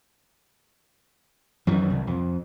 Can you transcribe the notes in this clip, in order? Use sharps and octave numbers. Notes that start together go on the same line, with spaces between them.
F#2 D#3 E3
C2
F2